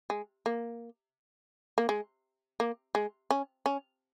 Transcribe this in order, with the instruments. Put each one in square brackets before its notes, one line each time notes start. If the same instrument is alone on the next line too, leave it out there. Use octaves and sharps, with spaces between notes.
[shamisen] G#3
A#3
A#3
G#3
A#3
G#3
C#4
C#4